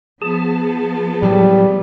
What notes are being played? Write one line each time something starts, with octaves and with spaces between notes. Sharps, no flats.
F3 B3 G#4 A5
A2 F#3 G3